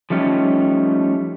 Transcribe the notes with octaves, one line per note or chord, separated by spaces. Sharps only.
F3 G3 A3 C#4 D#4 G4